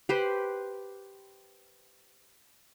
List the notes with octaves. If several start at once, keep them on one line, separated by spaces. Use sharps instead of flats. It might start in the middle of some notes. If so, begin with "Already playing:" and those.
G4 B4 C5